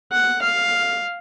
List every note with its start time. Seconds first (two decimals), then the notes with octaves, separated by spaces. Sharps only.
0.12 F#5
0.42 F5